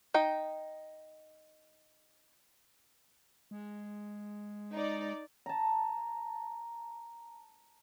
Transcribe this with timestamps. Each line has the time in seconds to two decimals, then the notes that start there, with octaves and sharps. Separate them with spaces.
0.14 D#4 G5
3.51 G#3
4.73 D#4 D5
5.46 A5 A#5